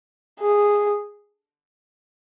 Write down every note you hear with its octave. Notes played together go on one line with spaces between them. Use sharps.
G#4